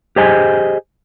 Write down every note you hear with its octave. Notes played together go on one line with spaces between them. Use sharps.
G4 G#4 C5 D#5 G#5